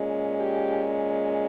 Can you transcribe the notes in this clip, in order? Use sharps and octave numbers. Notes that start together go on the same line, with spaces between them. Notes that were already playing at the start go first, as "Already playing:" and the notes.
Already playing: A#2 G#3 C#4
G4